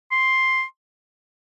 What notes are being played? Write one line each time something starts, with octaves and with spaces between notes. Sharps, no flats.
C6